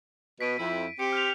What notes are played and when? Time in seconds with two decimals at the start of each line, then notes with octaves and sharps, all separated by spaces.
0.41 B2 B6 D7 D#7
0.58 F2 E4
0.99 C4 G4 C#7 D7
1.12 F6 G6 F7